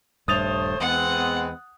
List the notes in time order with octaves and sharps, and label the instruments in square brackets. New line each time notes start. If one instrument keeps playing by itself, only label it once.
[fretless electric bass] D#1 G2 [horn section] A3 C5 C#5 [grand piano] D#6 A6 F7
[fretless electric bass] E2 [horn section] G#3 B3 C4 [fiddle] F#5